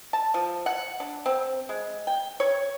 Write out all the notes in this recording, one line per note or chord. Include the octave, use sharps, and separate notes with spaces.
A5
F3
F#5
D4
C4
G#3
G5
C#5